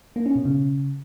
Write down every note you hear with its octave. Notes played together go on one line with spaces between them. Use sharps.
A#3
C#4
B2
C#3